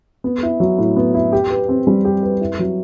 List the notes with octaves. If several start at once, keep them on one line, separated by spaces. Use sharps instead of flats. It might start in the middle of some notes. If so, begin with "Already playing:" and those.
B3
E4
F#3
A2
B3
E4
G4
B4
C4
G3
G4
B4
E4
F#3